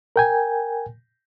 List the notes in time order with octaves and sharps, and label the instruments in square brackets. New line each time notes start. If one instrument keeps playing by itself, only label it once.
[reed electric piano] A#4 G5 G#5